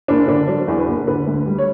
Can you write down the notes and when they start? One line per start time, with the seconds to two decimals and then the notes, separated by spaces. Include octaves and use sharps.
0.08 F#1 D4
0.28 D3 D4
0.48 F#3 D4
0.68 E2
0.78 B4
0.88 F#1
1.07 D3 B4
1.27 D2
1.46 G3
1.58 C#5